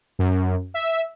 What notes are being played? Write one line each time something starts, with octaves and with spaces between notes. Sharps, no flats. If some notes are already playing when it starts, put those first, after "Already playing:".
F#2
E5